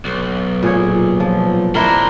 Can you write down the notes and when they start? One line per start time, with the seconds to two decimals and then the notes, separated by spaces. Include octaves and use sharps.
0.05 B1
0.63 A#2 G#4 C#5
1.20 F3
1.75 D#3 D4 E4 A#4 C5